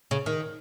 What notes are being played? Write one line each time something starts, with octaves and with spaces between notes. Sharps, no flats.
C#3
D#3